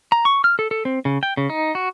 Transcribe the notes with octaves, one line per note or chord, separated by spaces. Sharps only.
A#5
C#6
F6
A4
A4
C4
C#3
G5
C#3
D#4
F#4